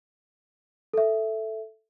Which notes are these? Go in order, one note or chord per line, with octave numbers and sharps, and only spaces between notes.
A4 E5